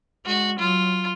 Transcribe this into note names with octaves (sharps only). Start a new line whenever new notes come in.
G#3 F#4
F#3 F4